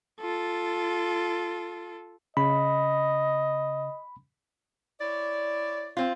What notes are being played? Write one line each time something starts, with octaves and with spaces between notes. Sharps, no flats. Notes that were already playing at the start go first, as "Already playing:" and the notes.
F4 A4
C#3 D#5 B5
E4 C#5 D5
C4 F4